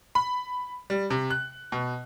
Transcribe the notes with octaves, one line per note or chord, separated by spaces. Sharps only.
B5
G3
C3
F#6
B2